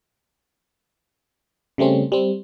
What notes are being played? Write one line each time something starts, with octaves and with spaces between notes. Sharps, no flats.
C#3 G3 A3 C4 C#4
G3 C4